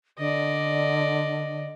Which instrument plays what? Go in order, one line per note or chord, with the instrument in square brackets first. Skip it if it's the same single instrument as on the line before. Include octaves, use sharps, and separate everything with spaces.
[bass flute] D3 [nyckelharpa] D5 D#5